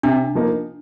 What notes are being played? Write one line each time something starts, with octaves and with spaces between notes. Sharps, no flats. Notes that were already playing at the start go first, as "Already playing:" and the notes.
C3 D4
F3 A#3 D#4